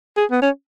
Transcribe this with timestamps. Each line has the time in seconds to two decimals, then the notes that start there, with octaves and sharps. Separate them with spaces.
0.17 G#4
0.31 B3
0.42 C#4